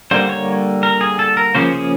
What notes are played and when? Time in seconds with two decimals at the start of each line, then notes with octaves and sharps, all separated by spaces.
0.11 D3 G3 A#3 C5
0.29 C#5
0.83 A#4
1.01 G#4
1.19 A4
1.37 A#4
1.55 C#3 F3 A#3 C#4 C5
1.72 G#4